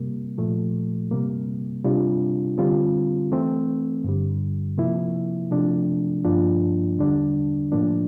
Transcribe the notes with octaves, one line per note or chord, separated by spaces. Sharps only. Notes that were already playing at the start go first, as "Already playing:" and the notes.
Already playing: C3 G3 A#3
A#2 F3 A3
C3 G3 A#3
C3 G3 D4 F4
D3 G3 C4 F4
E3 A3 C4
G2 D3 G3
C3 F3 A#3 E4
C3 F3 A3 D4
G2 F3 A#3 D4 F4
E2 D3 G3 D4
A2 F3 A#3 D4